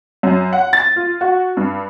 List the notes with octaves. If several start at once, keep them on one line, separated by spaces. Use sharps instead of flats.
F#2
F#5
A6
F4
F#4
G2